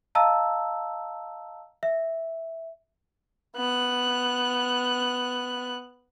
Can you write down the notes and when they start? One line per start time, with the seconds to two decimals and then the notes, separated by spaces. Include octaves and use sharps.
0.15 D#5 F5 A5 A#5 E6
1.83 E5
3.56 B3 F#6